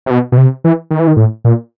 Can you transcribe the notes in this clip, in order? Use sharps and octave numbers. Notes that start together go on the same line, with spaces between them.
C3
B2
B2
C3
E3
D#3
E3
D#3
A2
A#2